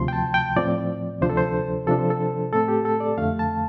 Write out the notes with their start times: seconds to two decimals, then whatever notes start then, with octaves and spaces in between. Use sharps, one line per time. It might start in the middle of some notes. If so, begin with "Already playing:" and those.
Already playing: D2 C3 F3 C6
0.08 G5
0.13 A5
0.34 G5
0.56 A2 F3 C4 D5
1.21 D2 C3 F3 D4 C5
1.30 A4
1.37 C5
1.87 C3 F3 D4 A4
1.99 C5
2.10 A4
2.52 A2 A3 C4 A4
2.68 G4
2.85 A4
3.00 D5
3.17 F2 D3 A3 F5
3.39 A5